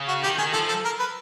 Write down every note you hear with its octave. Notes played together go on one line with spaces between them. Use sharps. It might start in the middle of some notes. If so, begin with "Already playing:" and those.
Already playing: C#3
F#4
D#3 G4
D#3 G#4
F3 A4
A4
A#4
B4